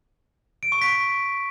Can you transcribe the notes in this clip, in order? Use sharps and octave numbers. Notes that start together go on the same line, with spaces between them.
D7
C#6
B6